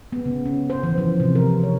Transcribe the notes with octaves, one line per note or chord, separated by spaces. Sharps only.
B3
C#3
C#4
C5
E3
F3
C3
A#4
C#5